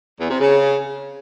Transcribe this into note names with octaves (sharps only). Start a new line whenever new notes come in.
E2
C3
C#3